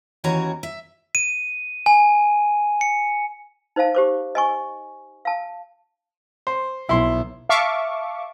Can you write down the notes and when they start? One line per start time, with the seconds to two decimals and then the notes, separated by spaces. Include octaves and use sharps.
0.24 D#2 E3 C#4 F#4 C#5 A#5
0.63 E5
1.15 D#7
1.86 G#5
2.81 C#7
3.76 D#4 C5 D#5 F5 A5
3.95 G4 C5 D6
4.35 D#5 G#5 C#6
5.25 F5 A5
6.47 C5
6.89 B1 E4 C6
7.49 E5 F5 A5 C#6 D6